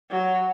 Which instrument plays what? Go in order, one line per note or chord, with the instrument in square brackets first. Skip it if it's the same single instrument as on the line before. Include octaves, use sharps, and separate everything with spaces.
[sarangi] F#3